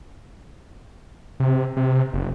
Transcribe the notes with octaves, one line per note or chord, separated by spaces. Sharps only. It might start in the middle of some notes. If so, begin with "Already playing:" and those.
C3
C3
F#1